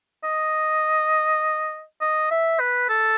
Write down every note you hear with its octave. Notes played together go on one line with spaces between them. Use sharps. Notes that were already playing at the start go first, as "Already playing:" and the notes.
D#5
D#5
E5
B4
A4